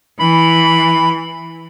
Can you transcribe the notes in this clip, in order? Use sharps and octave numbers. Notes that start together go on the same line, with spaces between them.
E3 B5